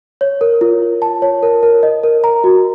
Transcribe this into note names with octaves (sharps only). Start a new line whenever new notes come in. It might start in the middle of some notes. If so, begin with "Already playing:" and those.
C#5
A#4
F4
F4
A5
C#5
A#4
A#4
D#5
A#4
A#5
F#4